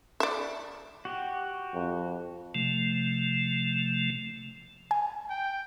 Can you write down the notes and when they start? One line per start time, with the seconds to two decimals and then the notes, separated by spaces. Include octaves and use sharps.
0.20 D5 E5
1.05 F#4 G4
1.74 F2
2.55 C3 F3 A3
4.91 G#5
5.30 G5